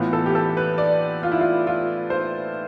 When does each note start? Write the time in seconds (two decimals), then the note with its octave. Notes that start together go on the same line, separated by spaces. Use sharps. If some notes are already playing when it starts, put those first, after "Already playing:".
Already playing: A2 E3 B3 F4
0.13 A4
0.26 G4
0.35 A4
0.57 B4
0.78 D5
1.23 F4
1.32 E4
1.40 F4
1.67 F4
2.10 C5